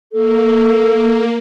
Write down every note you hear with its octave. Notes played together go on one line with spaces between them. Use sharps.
A#3 A4